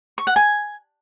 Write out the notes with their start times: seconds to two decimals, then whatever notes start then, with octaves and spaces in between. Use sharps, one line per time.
0.18 C#6
0.27 F#5
0.36 G#5